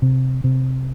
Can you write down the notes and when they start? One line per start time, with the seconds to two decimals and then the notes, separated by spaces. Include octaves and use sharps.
0.02 C3
0.44 C3